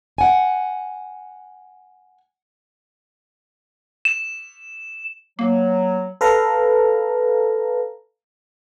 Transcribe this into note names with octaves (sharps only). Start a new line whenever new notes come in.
F#5 G#5
E7
F#3 A#3
A4 B4 F5 A#5